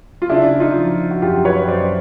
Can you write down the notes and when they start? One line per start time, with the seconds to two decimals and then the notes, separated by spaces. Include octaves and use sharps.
0.22 F4
0.29 C#3 D4 E4
0.60 D#4 F4
0.76 F3
1.11 F#4
1.22 F#2 F4 G4
1.45 B4 C#5
1.68 F#2 C5 D5